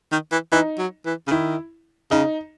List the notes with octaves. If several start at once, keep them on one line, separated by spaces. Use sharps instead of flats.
D#3
E3
E3 D#4
F#3
E3
C#3
D#3 E4
C#3 D#4